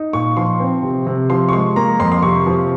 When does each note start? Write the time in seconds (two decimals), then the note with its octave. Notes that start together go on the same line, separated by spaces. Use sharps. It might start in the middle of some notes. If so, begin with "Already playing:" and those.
Already playing: D#4
0.13 A#2 C#6
0.37 F3 C6
0.60 C4
0.83 C3
1.07 C3
1.30 F3 C6
1.49 C#6
1.53 G#3 C6
1.76 A#3 A#5
2.00 F2 C6
2.12 C6
2.22 C3 C#6
2.46 F3